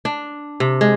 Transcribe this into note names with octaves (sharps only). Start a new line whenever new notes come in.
D4
C3
G#3